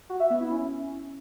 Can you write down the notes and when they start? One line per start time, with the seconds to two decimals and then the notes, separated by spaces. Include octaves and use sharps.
0.10 F#4
0.20 E5
0.30 B3
0.41 E4
0.51 C#4